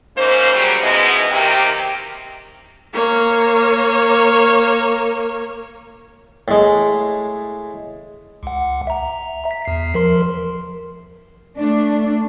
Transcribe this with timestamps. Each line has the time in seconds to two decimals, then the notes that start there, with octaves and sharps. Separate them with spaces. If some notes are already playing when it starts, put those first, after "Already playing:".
0.17 G#2 A#3 C#4 C5
0.51 C#3 F#3 G3
0.80 G#2 B2 G#3 B3 E4 D#5
1.31 C3 D#3 A#3 C4 G4
2.93 A#3 C#5
6.48 A2 G#3
8.43 C#2 F#5
8.87 E5 A#5
9.51 B6
9.65 E2 C7
9.94 F3 A#4 C6
11.57 A3 D4